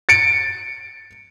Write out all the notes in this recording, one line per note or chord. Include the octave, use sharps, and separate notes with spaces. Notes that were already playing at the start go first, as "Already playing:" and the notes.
A6 C#7 D7